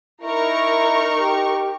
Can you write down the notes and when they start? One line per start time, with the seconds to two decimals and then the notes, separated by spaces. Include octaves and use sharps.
0.21 D#4 E4 A#4 C#6
1.20 G4